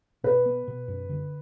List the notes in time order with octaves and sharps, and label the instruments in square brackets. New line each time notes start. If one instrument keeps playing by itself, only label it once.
[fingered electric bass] B2 [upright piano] B4
[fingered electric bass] B3
B2
F#2
D3